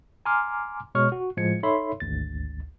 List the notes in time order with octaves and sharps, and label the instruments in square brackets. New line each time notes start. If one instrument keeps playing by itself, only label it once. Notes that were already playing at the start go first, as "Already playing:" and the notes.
[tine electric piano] G#5 A#5 C6 D6 F6
B2 G#3 C#5 C#6 F6
F#4
A2 F3 G#3 G#6 C#7
D#4 A4 C#5 E5 B5 C6
G#1 D2 A6